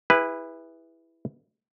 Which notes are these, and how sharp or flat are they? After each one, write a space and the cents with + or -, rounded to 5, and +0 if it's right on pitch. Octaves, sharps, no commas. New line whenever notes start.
E4 +0 G#4 -40 B4 +0